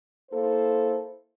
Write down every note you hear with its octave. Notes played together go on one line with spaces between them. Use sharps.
A#3 E4 A4 C5